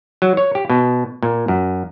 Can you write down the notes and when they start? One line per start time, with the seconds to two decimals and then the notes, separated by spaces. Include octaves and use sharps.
0.22 F#3
0.37 C#5
0.55 G4
0.70 B2
1.23 A#2
1.48 F#2